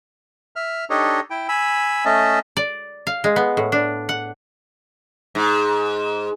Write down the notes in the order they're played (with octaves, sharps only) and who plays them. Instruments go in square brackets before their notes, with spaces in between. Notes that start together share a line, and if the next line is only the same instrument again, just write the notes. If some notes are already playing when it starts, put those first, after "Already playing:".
[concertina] E5 F6
D4 D#4 G4 A4 C#5 D#5
E4 G5
G#5 B5 E6
A3 C#4 D#5 E5 A5
[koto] D5
F5
G#3
B3
A2
D4
F#5
[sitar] G#2